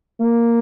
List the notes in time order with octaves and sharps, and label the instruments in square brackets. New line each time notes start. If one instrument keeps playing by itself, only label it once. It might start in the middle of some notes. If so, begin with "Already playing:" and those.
[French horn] A#3